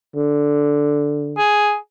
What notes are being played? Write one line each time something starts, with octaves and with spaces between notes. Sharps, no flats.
D3
G#4